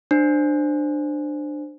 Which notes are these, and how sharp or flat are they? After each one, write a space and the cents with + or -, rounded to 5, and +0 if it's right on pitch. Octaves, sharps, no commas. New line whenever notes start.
D4 +20 C5 +0